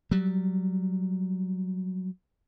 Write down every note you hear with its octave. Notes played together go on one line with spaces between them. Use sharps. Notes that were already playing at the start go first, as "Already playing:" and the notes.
F#3 G3